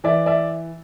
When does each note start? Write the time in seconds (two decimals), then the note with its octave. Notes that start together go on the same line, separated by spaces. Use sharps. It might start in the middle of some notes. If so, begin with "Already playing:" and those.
0.04 E3 D5 E5
0.26 D5 E5